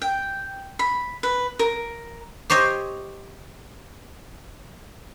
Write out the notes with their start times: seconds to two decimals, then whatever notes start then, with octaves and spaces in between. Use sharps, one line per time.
0.02 G5
0.79 B5
1.23 B4
1.59 A#4
2.50 G4 C5 C#5 D#5